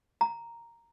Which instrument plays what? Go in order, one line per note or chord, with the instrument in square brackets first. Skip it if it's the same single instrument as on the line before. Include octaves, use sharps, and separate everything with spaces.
[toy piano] A#5